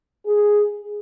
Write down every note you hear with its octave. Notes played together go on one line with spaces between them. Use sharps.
G#4